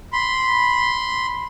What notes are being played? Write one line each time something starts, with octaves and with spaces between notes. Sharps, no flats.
B5 C6